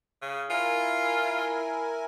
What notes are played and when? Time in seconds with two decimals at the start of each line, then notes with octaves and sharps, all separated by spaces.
0.22 C#3
0.50 E4 F4 A#4 G#5